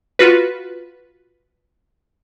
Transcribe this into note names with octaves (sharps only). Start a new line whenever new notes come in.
F4 F#4 B4